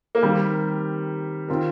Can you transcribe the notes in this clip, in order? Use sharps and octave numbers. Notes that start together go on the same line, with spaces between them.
A#3
D#3 G3 C4 G4 A#4
D#3 C4 F4 A#4